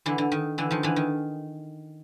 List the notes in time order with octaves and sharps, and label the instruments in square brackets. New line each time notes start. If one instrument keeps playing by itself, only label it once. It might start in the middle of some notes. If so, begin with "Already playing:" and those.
[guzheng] D3 E3
D3
D#3
D3 E3
D#3 F3
D3 E3
D#3